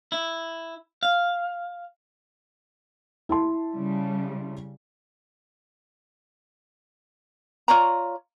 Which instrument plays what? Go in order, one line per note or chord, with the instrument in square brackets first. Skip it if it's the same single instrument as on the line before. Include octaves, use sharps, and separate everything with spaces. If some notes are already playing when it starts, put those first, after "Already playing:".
[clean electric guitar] E4
F5
[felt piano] E4 A5 C6
[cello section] C#3 G3
[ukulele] F4 C#5 D5 A#5